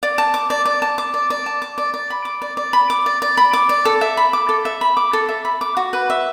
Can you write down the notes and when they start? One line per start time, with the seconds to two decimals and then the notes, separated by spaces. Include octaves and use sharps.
0.03 D5
0.18 A5
0.34 D6
0.50 D5
0.65 D5
0.82 A5
0.98 D6
1.14 D5
1.30 D5
1.46 A5
1.62 D6
1.78 D5
1.94 D5
2.10 B5
2.25 D6
2.42 D5
2.57 D5
2.73 B5
2.90 D6
3.06 D5
3.22 D5
3.37 B5
3.53 D6
3.69 D5
3.85 A4
4.01 E5
4.17 B5
4.33 D6
4.49 A4
4.65 E5
4.81 B5
4.97 D6
5.13 A4
5.29 E5
5.45 B5
5.61 D6
5.77 F#4
5.93 B4
6.10 E5